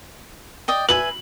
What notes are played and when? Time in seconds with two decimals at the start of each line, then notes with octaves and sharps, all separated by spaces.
0.68 D5 D#5 G5
0.89 B4 E5 G#5 F#7